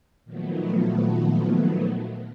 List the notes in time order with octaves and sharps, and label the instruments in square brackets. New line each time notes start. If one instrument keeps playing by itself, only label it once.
[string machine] A#2 D#3 F3 F#3 A3 B3